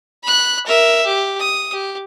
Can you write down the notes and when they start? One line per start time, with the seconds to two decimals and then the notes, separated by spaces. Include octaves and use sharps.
0.24 B5 F#6
0.66 A#4 E5
1.06 G4
1.39 D#6
1.72 G4